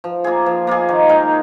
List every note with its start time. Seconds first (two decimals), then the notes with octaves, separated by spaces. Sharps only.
0.04 F3
0.24 A#3 F4 G#4
0.46 F3
0.67 A#3 F4 G#4
0.89 D#3
1.09 G#3 D#4 A#4